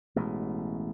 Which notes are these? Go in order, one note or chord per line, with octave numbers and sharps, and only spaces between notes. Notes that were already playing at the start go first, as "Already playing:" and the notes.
A1 B2 G#3